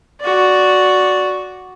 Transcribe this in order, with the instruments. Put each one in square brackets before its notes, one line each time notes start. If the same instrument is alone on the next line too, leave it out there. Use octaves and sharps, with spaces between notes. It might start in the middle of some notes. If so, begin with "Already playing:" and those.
[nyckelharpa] F#4 D5